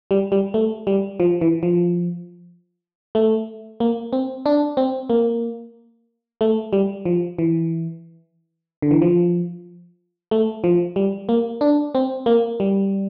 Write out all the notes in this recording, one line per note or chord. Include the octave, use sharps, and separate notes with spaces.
G3
G3
A3
G3
F3
E3
F3
A3
A#3
C4
D4
C4
A#3
A3
G3
F3
E3
D3
E3
F3
A3
F3
G3
A#3
D4
C4
A#3
G3